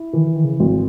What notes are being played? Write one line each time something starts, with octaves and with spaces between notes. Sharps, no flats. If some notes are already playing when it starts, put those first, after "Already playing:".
Already playing: E4
D#3 E3
D#3
C#3
G#1